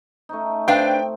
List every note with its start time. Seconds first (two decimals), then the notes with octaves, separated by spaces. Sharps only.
0.29 A3 C#4 D#4
0.68 C4 D4 B4 F5 G5